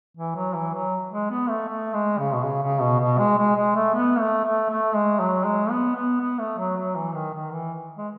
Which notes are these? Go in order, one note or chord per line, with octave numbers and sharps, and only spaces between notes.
E3
F#3
E3
F#3
G#3
B3
A3
A3
G#3
C#3
B2
C#3
C#3
B2
B2
G#3
G#3
G#3
A3
B3
A3
A3
A3
G#3
F#3
G#3
B3
B3
B3
A3
F#3
F#3
E3
D#3
D#3
E3
G#3